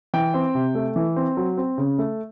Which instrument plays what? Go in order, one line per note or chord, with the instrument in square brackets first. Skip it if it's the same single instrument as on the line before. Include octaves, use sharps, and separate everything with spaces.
[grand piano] E3 G5
C4
C3
A3
E3
C4
F#3
C4
C#3
A3